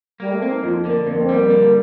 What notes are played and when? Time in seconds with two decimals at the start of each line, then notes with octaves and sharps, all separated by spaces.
0.20 G3 A#3
0.31 A3
0.42 A#3 C4
0.52 D#4
0.63 F2 F4
0.85 D3 A#3
1.06 F2 A#3
1.20 C4
1.29 G3
1.34 A#3
1.50 D3